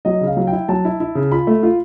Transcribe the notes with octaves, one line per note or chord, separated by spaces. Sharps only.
F#3 D#5
C#3
F5
F#3
E4 G5
F#3 A5
E4
E4
C#3
F4 B5
A3
F4